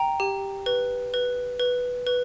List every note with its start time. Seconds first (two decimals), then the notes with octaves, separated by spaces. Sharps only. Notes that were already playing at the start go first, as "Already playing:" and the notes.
Already playing: G5 A#5
0.20 G4
0.66 B4
1.14 B4
1.59 B4
2.07 B4